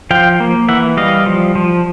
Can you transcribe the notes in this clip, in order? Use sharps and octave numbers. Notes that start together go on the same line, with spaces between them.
F3 F5 G5
A#3
E3 E5 F#5
G3 D#5 F5
F3
F3